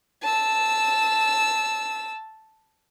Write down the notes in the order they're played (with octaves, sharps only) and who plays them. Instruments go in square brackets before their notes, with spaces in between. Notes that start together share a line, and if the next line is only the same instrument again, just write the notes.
[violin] A5 E6